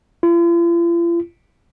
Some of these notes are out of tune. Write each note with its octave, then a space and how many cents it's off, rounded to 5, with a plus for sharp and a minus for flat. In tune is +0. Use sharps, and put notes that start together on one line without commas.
F4 -45